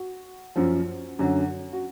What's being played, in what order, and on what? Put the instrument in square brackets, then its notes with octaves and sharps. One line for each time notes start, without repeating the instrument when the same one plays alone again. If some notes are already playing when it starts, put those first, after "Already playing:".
Already playing: [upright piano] F#4
F#2 F3
F#2 D3 F#3
F#4